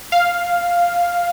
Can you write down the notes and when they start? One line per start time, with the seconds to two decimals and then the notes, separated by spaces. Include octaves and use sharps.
0.12 F5